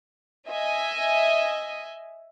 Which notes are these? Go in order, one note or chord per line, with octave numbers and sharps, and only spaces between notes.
D#5 E5 G#5